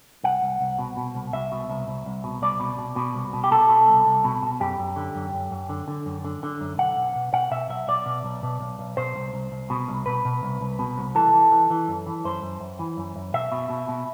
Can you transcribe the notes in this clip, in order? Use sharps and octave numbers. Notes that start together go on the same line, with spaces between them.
C2 F#5
C2
C2
B2
B2
C2
C2 E5
B2
C2
C2
C2
B2
C2 D5
B2
B2
B2
C2
B2
G4
B2 A4
B2
C2
C2
B2
B2
F#2 G4
F#2
D3
F#2
F#2
F#2
D3
D3
F#2
D3
D3
F#2
B1 F#5
B1
B2
B2 F#5
B2 E5
B1 E5
B1 D5
B2
B1
B2
B1
B1
B2 C5
C2
C2
C2
B2
C2
B2 B4
B2
C2
C2
B2
C2
E3 A4
E3
E3
E3
F#2
E3
F#2 C5
F#2
F#2
E3
F#2
F#2
B2 E5
B2
B2
B2